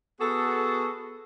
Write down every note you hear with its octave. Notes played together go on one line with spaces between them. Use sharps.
B3 F#4 G#4 A4